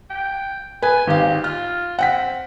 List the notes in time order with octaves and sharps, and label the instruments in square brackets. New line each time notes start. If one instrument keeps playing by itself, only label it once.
[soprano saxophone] G5
[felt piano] B4 [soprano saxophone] G#5
[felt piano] G#1 F5 [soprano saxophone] G4
[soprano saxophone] F4 [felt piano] F6
[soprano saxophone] C4 [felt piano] F#5 G5 B6